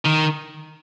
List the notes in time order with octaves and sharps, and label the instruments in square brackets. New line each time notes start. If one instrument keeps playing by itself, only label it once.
[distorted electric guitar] D#3